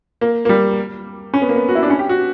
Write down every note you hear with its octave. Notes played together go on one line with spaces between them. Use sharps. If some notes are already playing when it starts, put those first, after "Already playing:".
A#3
A#3
G3
C#4
B3
A#3
B3
F#4
E4
D4
C#4
G4
F#4